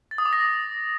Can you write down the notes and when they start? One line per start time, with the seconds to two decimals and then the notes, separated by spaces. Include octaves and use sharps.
0.11 A6
0.18 D#6
0.25 D6
0.33 A#6